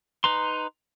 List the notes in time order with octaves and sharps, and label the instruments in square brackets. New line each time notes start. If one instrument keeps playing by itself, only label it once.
[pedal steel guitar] D#4 B4 A#5 C6